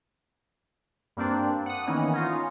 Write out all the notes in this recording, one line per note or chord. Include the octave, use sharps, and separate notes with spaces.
G2 A#3 C4 D4
F#5 D#6
D#3 E3 A#3 B3 C#4 D#4
C#4 D#4 F4